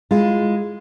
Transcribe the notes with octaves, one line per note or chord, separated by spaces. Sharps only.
G#3 E4 F4